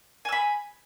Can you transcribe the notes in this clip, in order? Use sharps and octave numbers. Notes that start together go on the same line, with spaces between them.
G#5 B5 E6